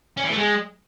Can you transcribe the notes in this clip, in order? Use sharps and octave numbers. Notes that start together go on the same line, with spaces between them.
C#4
E3
A3
G#3